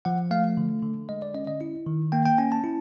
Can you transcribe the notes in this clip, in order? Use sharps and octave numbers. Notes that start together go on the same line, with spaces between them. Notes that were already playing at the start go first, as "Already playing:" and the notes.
F3 F#5
A3 F5
D3
D3
G#3 D#5
D5
C#4 D#5
D#5
E4
D#3
A#3 G5
G5
C#4 G#5
A5
E4